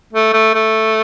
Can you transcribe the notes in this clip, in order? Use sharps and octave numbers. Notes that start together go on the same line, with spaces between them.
A3
A3
A3